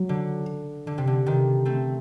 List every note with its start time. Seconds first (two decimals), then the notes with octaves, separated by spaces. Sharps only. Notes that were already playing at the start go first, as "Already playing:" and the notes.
Already playing: F#3
0.09 D3
0.87 D3
0.98 C3
1.07 D3
1.26 C3 D#3
1.65 A3 C4